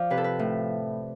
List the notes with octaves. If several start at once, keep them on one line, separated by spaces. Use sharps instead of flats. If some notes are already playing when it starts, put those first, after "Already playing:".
Already playing: F3 D5
C3 B4
A4
B4
A2